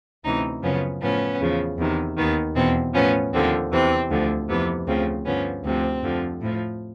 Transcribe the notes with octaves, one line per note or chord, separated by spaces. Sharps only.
D2 C3 E3 C#4 D#4
F#2 C#3 F3 B3 C#4
A2 F3 B3 C#4
E2 C#3 F3
E2 C3 D#3
D#2 D#3 B3
E2 B2 C4
A2 F3 B3 C#4
D#2 D3 F3 C4
E2 C3 E3 C4
D2 D3 F3
F2 C3 E3 B3
D2 C#3 F3 C4
G2 D3 F3 B3 C#4
D2 C3 F3 C4
F2 D3 F3
A2 F3